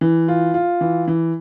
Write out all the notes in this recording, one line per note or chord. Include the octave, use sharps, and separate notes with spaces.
E3
F4
F4
E3
E3